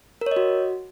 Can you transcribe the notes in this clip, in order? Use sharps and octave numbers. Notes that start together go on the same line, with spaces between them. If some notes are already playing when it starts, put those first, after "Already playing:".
A#4
C#5
D#5
F#4